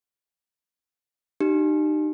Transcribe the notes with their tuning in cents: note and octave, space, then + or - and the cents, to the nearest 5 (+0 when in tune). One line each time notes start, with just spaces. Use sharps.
D#4 -30 G4 -30